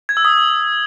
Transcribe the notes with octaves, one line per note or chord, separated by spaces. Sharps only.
G#6
E6
D#6